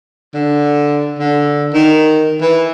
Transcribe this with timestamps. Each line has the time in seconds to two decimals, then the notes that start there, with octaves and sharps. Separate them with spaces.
0.34 D3
1.19 D3
1.74 D#3
2.42 E3